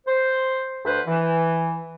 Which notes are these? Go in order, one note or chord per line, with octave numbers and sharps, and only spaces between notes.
C5
D2 B4 C5
E3